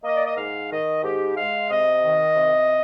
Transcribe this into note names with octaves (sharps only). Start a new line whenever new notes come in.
A#3 D#5
D5
D#5
G#2 F5
D#3 D#5
G#2 G4
G#3 F5
C3 D#5
D#3
C3